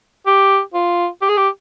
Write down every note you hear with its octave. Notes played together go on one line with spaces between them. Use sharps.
G4
F4
G4
G#4
G4